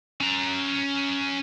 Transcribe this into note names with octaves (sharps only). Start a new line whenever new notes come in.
C#4 A#5